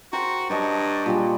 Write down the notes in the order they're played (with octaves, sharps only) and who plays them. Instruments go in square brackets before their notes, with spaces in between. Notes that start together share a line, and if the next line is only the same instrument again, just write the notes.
[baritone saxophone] F#4 [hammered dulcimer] A#4 C5 G5
[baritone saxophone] G2 [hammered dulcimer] C#5 D#5 A5
[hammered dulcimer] A#2 G3 G#5